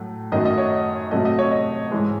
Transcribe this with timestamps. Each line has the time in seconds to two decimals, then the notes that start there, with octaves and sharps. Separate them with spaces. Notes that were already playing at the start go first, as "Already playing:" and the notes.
Already playing: A2 F#3 A3
0.32 F#2 D#3 F#3 A3 D#5
0.45 D#5
0.58 C#5
1.11 C3 F#3 A3 D#5
1.25 D#5
1.39 C#5
1.51 D#5
1.91 G#2 E3 G#3